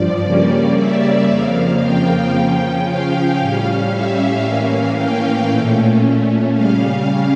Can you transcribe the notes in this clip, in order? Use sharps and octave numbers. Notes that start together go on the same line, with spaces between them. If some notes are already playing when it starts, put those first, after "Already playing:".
Already playing: G2 F3 D5
C#3 G3 A#3 C#4
E5
F2 C#3 F3 A#3 F5
G5
C#3 F3 C#4
F5
A2 G3 C#4
E5
A2 E3 A#3 C#4 F5
G5
A#2 A3 C#4
C#3 G3 C#4 F5